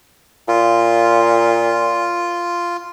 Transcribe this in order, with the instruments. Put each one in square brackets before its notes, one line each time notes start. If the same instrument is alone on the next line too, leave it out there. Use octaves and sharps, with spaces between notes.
[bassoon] A#2 [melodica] F4